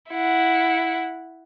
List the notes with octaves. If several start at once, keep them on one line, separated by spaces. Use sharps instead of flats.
E4 F#5